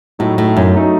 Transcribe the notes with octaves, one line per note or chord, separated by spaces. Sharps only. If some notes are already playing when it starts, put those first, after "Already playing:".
A2 F#3 A3 D#4
A2
F#2
F#3 A3 D#4